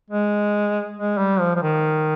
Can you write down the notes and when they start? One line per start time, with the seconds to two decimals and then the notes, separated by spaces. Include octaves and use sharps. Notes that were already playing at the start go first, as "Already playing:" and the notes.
0.10 G#3
0.97 G#3
1.18 G3
1.40 F3
1.56 F3
1.62 D#3